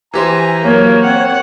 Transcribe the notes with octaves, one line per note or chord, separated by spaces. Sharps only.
E3 G4 C5 G#5 A#5
F#3 A#3 C#5
C4 F#5